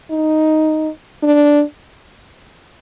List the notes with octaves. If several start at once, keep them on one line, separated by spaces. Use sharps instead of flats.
D#4
D4